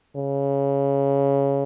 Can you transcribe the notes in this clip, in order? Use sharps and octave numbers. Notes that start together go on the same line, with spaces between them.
C#3